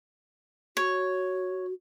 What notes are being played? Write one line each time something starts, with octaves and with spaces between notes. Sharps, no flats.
F#4 C#5